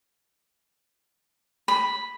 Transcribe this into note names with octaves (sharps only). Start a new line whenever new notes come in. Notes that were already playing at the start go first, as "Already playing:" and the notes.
B5